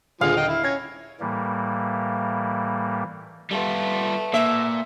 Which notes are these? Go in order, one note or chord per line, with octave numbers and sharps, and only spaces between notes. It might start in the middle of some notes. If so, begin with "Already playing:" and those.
D#1 D3 F3 G#3 G#4 F5
D#5 G5
E4
C#4 G#6 A#6
A2 E3 G3 A#3
G3 A3 B3 F4
A#2 E5